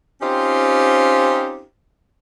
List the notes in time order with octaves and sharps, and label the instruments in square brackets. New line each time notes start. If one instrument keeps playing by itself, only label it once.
[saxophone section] C4 C#4 D#4 F4 G4 C5